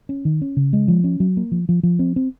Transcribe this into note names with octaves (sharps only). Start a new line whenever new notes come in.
C#4
D#3
C#4
C#3
G#3
F3
C#4
F#3
A#3
F3
F3
F3
C4
C4